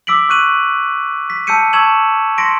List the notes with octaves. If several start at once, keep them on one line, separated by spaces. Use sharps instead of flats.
D6 E6 B6 D7 F#7
C#6 F#6 D#7 F#7
B6
A5 E6 G6 B6 C#7 D#7
A5 C#6 E6 G#6 E7 F#7
C6 A#6 B6 C#7 D7